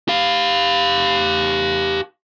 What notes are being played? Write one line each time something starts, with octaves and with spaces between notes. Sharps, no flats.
G4 F5